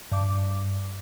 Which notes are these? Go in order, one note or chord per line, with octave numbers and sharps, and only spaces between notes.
G2 D6